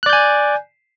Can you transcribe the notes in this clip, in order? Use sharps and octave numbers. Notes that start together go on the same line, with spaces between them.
D5 G#5 F#6 G6